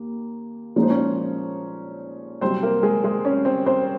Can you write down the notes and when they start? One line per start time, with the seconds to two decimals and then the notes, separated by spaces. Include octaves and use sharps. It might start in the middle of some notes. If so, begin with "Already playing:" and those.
Already playing: D#2 A#3
0.76 A#2 F3 G#3 D#4 C#5
0.83 C5
0.90 C#4 C#5
2.41 C2 C3 F#3 C4 C5
2.63 A#3 A#4
2.83 G#3 G#4
3.04 G#3 G#4
3.25 C#4 C#5
3.45 C4 C5
3.66 C4 C5